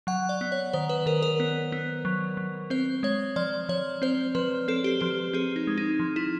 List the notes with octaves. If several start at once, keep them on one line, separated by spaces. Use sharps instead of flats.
F#3 F#5
D5
B3
C#5
D#3 C5
B4
D#3 A#4
A#4
B3
B3
F#3
F#3
C4 C5
G#3 C#5
F3 D5
F3 C#5
C4 C5
F3 B4
C4 A4
G4
F3 G4
C4 G#4
D#4
G#3
D#4
F3
E4